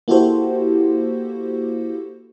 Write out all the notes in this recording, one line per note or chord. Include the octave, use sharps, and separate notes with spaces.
A#3 E4 F#4 G4 A4 C5